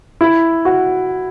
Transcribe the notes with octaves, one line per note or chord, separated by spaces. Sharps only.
E4
F#4